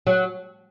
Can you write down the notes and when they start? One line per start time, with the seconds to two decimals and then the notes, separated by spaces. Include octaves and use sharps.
0.07 F#3